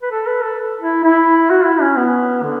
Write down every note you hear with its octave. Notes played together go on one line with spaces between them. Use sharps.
B4
A4
B4
A4
E4
E4
F#4
E4
C#4
B3
D3